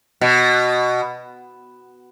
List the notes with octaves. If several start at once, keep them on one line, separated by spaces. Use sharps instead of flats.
B2